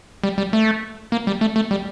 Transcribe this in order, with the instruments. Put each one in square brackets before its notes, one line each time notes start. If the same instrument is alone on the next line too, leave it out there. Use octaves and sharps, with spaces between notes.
[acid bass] G3
G3
A3
A#3
G3
A3
A3
G3